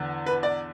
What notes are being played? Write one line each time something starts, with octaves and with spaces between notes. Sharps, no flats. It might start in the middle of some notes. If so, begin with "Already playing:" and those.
Already playing: E2 D3
B4
D5